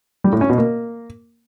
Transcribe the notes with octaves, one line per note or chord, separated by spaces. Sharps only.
G3
A2
C#4
B2
A#3